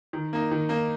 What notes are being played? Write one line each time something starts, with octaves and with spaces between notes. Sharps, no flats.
D#3
A#3 D#4
D#3
A#3 D#4